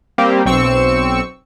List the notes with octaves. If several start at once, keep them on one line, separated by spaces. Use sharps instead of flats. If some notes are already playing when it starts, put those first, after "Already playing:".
G3 A#3 C4 G4
B1 C4 C#6 E6 C#7